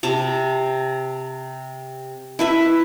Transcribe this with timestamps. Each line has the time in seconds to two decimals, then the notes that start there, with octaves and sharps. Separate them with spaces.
0.03 C3 A5 A#5
2.39 E4 B4 E5